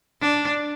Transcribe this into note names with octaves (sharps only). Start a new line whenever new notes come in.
D4